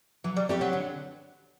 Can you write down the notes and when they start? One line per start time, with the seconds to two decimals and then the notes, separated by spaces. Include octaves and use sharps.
0.24 E3 F#3
0.36 G3
0.49 A3 C4 G4 B4
0.61 F#3
0.73 D3